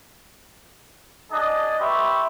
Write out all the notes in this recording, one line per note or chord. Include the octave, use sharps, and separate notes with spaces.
D4 G#4 D#5
G4 B4 E5 C6 C#6